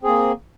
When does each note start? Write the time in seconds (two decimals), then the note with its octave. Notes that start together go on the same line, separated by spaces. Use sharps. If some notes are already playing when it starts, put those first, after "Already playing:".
0.01 C4
0.04 G#4
0.07 A#3